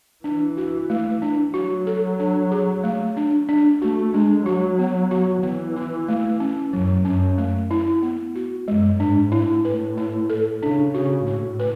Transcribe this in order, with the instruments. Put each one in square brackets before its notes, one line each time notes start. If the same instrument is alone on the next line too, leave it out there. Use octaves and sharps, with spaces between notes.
[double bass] E3 [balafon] D4
[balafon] F#4
A3
D4
[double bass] F#3 [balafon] F#4
[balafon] A4
D4
G#4
A3
D4
D4
[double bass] A3 [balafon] F#4
[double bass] G#3 [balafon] D4
[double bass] F#3 [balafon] F#4
[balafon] B3
F#4
[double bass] E3 [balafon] B3
[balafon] E4
A3
C#4
[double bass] F#2 [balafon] F#3
[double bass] F#2 [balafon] C#4
[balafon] A3
E4
B3
F#4
[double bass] F#2 [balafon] G#3
[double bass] G#2 [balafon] D4
[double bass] A2 [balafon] E4
[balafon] B4
E4
A4
[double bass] C#3 [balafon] D4
[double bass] C#3 [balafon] F#4
[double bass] A2 [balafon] F#4
[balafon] B4